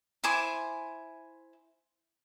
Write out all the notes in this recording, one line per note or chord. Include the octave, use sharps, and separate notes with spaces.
E4 C5 G#5 D6